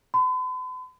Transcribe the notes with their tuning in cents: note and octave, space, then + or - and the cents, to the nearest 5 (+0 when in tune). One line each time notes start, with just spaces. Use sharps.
B5 +45